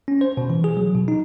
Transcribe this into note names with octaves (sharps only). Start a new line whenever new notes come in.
C#4
C5
B2
E3
G#4
F#3
B2
D#4